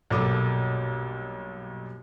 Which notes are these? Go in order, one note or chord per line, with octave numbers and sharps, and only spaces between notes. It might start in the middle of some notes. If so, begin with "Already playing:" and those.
B1 G2 A#2 A4 D6 D#6